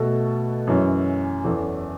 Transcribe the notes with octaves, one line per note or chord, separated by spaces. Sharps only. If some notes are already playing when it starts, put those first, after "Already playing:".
Already playing: B2 A3 F#4 A4
F#2 E3 C#4
E2 E3 C#4 A4